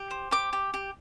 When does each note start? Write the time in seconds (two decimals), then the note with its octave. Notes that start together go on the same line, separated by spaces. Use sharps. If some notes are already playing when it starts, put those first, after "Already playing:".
Already playing: G4
0.11 C5
0.31 G4 D6
0.53 G4
0.74 G4